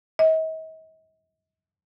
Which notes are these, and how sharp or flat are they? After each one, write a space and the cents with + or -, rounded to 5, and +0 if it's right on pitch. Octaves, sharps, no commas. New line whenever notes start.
D#5 +45